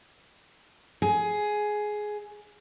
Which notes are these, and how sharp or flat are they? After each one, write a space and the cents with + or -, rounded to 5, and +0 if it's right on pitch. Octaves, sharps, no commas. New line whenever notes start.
G#4 +10